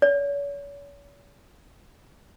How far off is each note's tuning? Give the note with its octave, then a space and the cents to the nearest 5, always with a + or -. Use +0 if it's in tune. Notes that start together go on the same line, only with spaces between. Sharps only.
C#5 +40